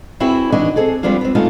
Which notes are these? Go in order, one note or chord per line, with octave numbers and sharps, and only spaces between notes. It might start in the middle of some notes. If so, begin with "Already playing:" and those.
C4 E4 F#4 G#4 B4
D#3 E3 D4 F#4 C#5 D#5
C4 G#4 A4
F3 G3 B3 C4 D4 F4
B3 C4
C#3 A3 B3 D#4 F4 D#5